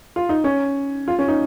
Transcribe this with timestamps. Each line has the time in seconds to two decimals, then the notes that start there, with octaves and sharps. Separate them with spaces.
0.16 F4
0.29 D#4
0.44 C#4
1.08 F4
1.19 C#4
1.28 D#4